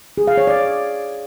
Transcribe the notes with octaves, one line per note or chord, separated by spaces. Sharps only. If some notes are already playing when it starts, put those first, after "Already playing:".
G#4
F5
C#5
D5